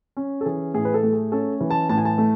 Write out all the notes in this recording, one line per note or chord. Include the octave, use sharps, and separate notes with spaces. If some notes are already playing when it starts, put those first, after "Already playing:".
C#4
A4
E3 G#4
A2 G#4
B4
A4
A3
G#4
C#4 A4
E3
A5
A2 A5
G#5
A5
A3